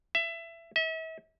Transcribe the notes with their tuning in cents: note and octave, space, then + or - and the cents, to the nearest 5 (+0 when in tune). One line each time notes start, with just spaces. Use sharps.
E5 +20
E5 -40